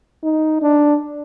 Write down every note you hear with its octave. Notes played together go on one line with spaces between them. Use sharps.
D#4
D4